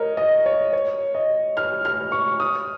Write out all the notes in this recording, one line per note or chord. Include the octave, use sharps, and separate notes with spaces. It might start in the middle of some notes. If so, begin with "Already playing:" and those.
Already playing: A#4 C#5 D#5
D#5
C#5
C#5
D#5
F6
F6
C#6
D#6